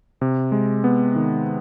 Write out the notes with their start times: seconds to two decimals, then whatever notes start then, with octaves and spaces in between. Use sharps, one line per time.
0.21 C3
0.52 G#3
0.84 B3
1.16 D#3